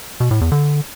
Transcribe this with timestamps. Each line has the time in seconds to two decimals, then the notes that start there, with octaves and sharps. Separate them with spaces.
0.20 B2
0.31 A2
0.41 E2
0.52 D3